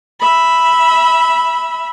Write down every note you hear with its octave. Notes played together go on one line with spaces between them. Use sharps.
E5 B5